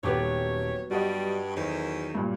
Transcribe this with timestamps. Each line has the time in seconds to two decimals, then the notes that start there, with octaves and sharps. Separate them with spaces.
0.03 D#1 F#3 B3 G4 B4 C#5 D6
0.91 G2 G3 F#4 D#5
1.56 E2 D#3 F#3 A#4 C5
2.15 G2 A#2